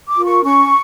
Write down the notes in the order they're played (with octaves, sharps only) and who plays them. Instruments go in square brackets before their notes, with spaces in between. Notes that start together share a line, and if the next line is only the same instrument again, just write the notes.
[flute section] D6
F4 A#4
C#6
C#4 C#6